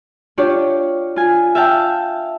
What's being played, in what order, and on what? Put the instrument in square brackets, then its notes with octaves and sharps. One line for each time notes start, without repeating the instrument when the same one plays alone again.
[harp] D4 F4 G4 C#5 D5
F4 G#5
E5 F5 G5 A5